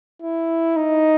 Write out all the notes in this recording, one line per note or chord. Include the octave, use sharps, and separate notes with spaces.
E4
D#4